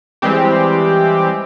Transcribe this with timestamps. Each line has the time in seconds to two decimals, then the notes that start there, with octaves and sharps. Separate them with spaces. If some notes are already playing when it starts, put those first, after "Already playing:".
0.22 E3 G3 G#3 C4 G4